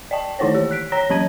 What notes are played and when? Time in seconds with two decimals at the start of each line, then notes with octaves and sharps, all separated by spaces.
0.11 D5 D#5 G5 A5
0.39 D#3 D#4 E4 C5 C#5
0.55 E3 G4
0.71 F#6 B6 D7
0.92 C#5 A#5 A#6 B6
1.10 E3 F#3 C#4 A5 G#6 D#7